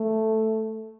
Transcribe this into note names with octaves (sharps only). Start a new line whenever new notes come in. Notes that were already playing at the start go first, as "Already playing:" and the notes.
Already playing: A3